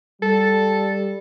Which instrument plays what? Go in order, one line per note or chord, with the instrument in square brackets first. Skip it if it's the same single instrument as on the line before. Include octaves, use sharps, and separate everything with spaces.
[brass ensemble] G3 [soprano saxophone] A4